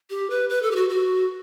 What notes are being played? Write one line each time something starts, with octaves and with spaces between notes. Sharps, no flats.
G4
B4
B4
A4
G4
F#4
F#4